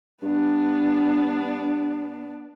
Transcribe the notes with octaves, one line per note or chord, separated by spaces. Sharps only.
G2 B3 D4